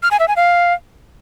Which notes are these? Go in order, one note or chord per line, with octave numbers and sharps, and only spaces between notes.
F6
G#5
E5
G#5
F5